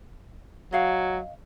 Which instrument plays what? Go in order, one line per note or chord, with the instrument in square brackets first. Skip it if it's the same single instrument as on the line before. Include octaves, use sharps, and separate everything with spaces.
[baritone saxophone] F#3 [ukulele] D#5 F5 F#5